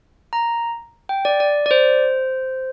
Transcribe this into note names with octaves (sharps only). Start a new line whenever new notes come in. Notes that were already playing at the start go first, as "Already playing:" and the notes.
A#5
G5
D5
D5
D5
C5